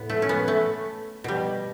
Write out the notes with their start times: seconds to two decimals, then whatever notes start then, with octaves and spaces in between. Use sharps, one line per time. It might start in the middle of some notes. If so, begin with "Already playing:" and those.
Already playing: A2 B3
0.10 A3
0.22 C#4
0.29 B3
0.48 A3
1.24 B2 G3